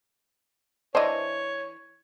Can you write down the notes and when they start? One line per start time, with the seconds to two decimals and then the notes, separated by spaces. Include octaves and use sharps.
0.95 E3 D4 C5 C#5 D#5